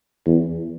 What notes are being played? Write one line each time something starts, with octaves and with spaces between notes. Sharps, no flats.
E2